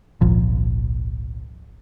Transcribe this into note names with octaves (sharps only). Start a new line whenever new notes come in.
G#1 C#2 A#2 F3